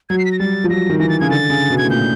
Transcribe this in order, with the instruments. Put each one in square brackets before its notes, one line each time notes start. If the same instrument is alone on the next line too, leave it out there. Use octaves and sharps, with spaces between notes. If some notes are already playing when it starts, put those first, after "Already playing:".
[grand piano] F#3 [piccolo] G#6
[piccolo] C7
B6
A#6
[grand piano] G3 [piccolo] A6
[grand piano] F3
[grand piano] F#3 [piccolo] A#6
[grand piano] D#3
[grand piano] E3 [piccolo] A#6
[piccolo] A6
[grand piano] C#3 [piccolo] G#6
[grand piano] D3 [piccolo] A6
[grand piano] C#3
B2
[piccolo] G#6
[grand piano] A2
[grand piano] A#2 [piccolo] G6